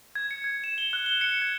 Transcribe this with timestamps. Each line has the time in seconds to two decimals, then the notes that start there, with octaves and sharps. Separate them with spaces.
0.15 G#6
0.31 C#7
0.44 G#6
0.64 E7
0.78 G7
0.93 F#6
1.06 G7
1.21 C#7
1.42 G#6